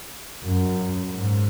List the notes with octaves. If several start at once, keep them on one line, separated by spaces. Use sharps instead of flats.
F#2
G#2